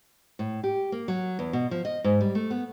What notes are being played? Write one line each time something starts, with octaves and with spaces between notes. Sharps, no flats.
A2
G4
A#3
F#3
E2
B2
F3
D#5
G#2
G3
A3
B3